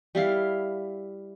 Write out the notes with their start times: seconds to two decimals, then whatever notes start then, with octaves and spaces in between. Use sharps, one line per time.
0.15 G3 E4 F5